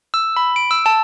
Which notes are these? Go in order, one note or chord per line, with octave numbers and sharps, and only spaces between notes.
E6
B5
D7
E6
A5